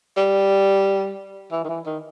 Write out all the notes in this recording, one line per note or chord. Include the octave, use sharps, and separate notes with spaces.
G3
E3
D#3
E3
D#3